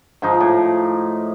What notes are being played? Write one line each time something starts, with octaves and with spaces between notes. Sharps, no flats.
G#2 F3 D#4 D6
A2